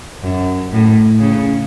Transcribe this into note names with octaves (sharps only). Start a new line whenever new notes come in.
F#2
A2
C#3